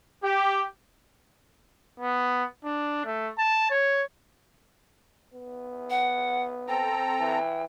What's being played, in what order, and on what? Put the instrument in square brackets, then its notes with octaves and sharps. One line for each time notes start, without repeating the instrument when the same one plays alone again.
[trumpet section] G4
[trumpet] B3
D4
A3
A5
C#5
[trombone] B3
[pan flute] F#5
[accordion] C4 A4 A#5 [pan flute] G5
[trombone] E3